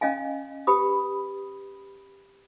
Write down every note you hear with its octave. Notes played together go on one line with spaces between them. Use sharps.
C#4 D#5 F5 G#5
G4 B4 B5 D#6